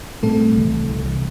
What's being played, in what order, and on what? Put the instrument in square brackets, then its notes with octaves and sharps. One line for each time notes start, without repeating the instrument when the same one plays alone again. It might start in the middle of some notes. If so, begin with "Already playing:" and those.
[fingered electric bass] A2 G3 C4 [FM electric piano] A3 A4
[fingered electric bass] C2 C3 E3
C2 C3 E3